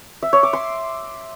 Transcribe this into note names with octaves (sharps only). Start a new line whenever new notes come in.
E5
C#5
D6
C6